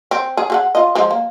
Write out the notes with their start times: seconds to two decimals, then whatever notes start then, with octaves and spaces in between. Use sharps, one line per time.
0.11 C4
0.37 G#4
0.50 G#4 A4 F#5
0.75 F4 D#5
0.95 F3 G#3
1.11 A#3